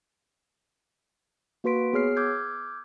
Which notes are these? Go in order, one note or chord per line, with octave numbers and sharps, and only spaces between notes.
A#3 F#4 B4 C6 B6 D7
B3 G#4 C#5 F6 C7
D6 E6 F6 G6 G#6